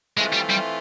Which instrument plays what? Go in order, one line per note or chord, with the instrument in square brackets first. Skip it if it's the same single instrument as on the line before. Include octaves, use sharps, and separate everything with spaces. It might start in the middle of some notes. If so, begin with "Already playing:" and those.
[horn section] E3 A3 C4 F4 [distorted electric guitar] G#3
[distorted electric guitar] G3
G3